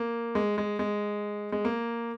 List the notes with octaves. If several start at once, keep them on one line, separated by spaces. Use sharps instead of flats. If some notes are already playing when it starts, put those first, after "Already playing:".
Already playing: A#3
G#3
G#3
G#3
G#3
A#3